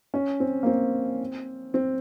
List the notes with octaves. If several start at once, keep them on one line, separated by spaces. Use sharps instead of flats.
C#4
C4
A#3
C4
C4